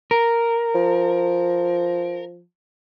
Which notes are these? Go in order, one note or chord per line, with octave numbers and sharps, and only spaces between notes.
A#4
F3